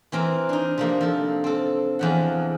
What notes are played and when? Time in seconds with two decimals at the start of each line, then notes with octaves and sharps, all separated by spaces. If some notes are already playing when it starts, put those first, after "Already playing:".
0.12 E3 C4 A#4
0.49 D4 D#4
0.78 C3 F3 A#3
1.01 F3 A4
1.44 C4 A4
1.99 E2 F3 F#5